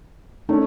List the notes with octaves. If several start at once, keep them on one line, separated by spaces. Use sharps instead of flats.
A3 C#4 D#4